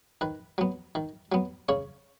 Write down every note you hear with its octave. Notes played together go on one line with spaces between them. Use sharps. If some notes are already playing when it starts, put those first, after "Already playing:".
D#3 B4
F#3 B3
D#3
F#3 B3
C#3 C#5